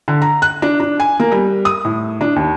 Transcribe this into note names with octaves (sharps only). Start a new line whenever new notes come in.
D3
A#5
F#6
D4
D4
G#5
A#3
G3
D#6
A2
D4
D#2